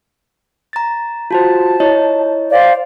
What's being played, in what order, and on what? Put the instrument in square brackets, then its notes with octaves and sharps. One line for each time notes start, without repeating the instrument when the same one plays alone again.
[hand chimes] A#5 A6
[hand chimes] F4 F#4 C5 [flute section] A5
[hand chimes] E4 C#5 D#5
[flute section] C5 D5 F5